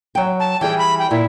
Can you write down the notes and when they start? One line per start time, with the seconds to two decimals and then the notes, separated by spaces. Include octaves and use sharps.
0.15 F#3 G5
0.40 A5
0.61 E3 G3 G#4 G5
0.78 B5
0.99 G5
1.11 A#2 E4